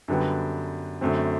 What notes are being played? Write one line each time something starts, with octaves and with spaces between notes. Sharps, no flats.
F#2 D3 G3 B3
F#2 D3 A3 C4